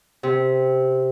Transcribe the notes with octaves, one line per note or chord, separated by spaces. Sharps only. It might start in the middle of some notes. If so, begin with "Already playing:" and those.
C3